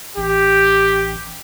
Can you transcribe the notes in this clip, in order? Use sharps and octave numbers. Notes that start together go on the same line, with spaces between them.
A1 G4